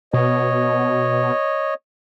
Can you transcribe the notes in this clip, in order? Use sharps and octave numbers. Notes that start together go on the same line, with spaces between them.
B2 C#5 D#5